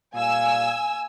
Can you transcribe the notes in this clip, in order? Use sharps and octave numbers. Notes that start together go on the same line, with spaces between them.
A#2 G3 F5 G#5 E6